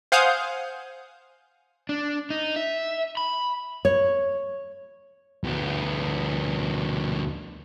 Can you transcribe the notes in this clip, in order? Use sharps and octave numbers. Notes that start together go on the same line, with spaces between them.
C5 F5 F#5 G#5 D#6 G6
D4
D#4
E5
B5
C#5
D2 B3